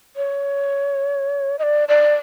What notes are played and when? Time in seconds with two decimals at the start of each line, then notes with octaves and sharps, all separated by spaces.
0.16 C#5
1.59 D#5
1.63 D5
1.89 D5